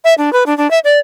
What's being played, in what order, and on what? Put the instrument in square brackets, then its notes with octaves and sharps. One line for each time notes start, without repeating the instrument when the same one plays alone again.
[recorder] E5
D4
B4
D4
D4
E5
D5